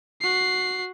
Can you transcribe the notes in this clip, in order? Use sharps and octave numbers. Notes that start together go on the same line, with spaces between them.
F#4 C7